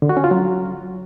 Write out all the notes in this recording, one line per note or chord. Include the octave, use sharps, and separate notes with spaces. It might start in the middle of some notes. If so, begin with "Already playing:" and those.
D3
F#4
C#4
F4
F#3